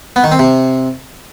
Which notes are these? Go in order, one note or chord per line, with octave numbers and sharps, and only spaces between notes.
B3
D#3
C4
C3